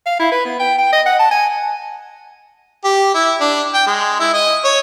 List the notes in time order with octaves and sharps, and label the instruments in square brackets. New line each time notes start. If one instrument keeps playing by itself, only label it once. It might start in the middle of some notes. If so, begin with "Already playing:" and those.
[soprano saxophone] F5
E4
B4
B3
G5
G5
D#5
F#5
A5
G#5
[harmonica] G4
E4
D4
G5
G#3
E4
D#5
C#5